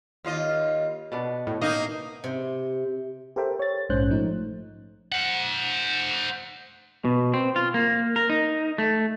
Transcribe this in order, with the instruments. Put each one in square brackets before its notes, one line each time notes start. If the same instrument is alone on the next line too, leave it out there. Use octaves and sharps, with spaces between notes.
[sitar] D#2 F4 D#5
[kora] B2 B3 D4
[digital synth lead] A2
[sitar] A#3 D#4 [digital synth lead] D#5
[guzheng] C3
[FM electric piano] G4 A4 A#4 C5 E5 G5
C#5 A6
A#1 G#2 C#4 C5 F#6 G6
F3 A3 D#4
[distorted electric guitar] C5 F#5
[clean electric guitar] B2
C4
F4
A#3
A#4
D#4
A3